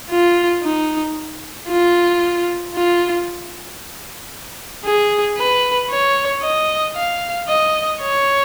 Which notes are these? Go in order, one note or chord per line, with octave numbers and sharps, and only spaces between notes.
F4
D#4
F4
F4
G#4
B4
C#5
D#5
F5
D#5
C#5